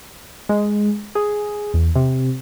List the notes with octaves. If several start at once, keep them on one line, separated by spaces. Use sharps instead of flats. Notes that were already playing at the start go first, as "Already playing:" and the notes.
G#3
G#4
E2
C3